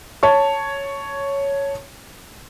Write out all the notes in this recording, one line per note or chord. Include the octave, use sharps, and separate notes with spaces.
C#5 A5 C#6